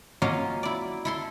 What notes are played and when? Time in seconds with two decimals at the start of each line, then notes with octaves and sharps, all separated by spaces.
0.22 F#3 A#3 C#4 F4 D#5 F5
0.63 E4 D5
1.05 E4 A4 C6